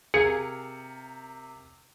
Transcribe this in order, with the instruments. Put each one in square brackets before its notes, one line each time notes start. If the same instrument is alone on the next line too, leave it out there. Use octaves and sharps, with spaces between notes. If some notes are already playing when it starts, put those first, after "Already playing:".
[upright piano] C3 A#4 F5 [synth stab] G#4 [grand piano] C#7